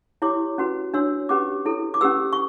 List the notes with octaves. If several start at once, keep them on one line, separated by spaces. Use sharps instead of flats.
E4 G4 C#5 D6
C#4 F#4 B4
D4 F#4 C#5 E6
C#4 G4 B4 D6
E4 A4 C#5
D6
C#4 G4 B4 E6
C#6